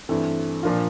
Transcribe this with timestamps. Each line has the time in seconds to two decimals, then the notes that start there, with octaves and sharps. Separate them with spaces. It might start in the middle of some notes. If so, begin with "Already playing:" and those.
0.09 G2 E3 A3 C4
0.63 A#2 F3 A#3 D4 F4